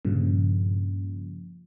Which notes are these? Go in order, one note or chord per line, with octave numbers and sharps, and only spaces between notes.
G2 A#2 C#3 F3